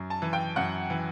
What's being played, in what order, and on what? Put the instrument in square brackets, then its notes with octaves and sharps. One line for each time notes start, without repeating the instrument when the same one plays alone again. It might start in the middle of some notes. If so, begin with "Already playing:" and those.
Already playing: [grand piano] F#2
A5
E3
G5
F#2 F#5
E3